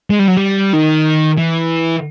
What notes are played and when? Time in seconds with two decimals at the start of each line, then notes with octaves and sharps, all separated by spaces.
0.10 G#3
0.19 G3
0.28 F#3
0.37 G3
0.73 D#3
1.38 E3